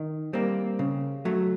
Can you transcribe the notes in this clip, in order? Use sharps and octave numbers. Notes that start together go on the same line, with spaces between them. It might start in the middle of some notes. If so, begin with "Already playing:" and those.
Already playing: D#3
G3 A#3 C4
C#3
F#3 A3